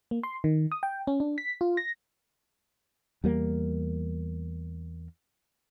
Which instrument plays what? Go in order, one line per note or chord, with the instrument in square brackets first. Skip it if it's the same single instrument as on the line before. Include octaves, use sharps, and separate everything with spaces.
[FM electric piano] A#3
C6
D#3
D#6
G5
C#4
D4
B6
F4
A#6
[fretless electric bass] E2 G3 A#3